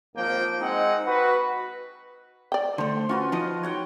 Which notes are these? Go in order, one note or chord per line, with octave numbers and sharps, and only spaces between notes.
G#1 F3 A#3 G5
G#3 C4 D#4 F#5
F#4 B4
D5 G5
D3 A3 C5
C#4 F4 F#4 B4
F3 D#4 D#5
C#5 F#5 G5